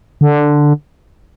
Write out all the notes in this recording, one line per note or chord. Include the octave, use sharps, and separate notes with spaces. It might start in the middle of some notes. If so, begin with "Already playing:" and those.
D3